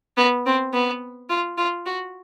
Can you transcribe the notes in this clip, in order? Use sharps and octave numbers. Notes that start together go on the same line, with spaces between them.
B3
C4
B3
F4
F4
F#4